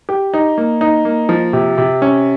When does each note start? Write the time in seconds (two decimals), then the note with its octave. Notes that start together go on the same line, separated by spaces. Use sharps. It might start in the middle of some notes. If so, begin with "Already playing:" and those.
0.09 G4
0.34 D#4
0.58 A#3
0.81 D#4
1.05 A#3
1.29 F3
1.53 C3
1.78 C3
2.02 C#4